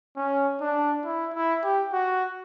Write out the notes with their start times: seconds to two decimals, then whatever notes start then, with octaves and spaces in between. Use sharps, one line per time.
0.16 C#4
0.61 D4
1.05 E4
1.34 E4
1.63 G4
1.93 F#4